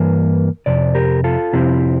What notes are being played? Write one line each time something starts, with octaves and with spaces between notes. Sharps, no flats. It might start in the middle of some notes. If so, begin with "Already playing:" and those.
Already playing: G2 E3 A#3 A#4
F2 C3 D5
G4 A#4
F4 A4
F2 C3 F3 C4 E4 G4